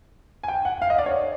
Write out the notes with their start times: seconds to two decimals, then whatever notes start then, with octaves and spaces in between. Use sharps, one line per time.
0.43 G#5
0.48 G5
0.65 F#5
0.82 F5
0.90 D#5
0.98 D5
1.06 C#5